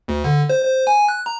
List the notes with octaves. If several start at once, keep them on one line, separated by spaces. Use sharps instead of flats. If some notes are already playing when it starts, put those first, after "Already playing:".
D2
D3
C5
C5
G#5
F#6
A#5